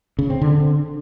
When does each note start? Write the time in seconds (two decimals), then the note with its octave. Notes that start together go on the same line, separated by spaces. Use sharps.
0.19 C#3
0.30 C4
0.41 D3